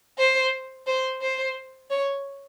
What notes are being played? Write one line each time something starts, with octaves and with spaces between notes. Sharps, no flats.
C5
C5
C5
C#5